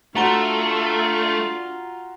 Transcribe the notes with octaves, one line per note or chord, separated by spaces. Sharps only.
A3 D4 F4 F#4 A#5 G7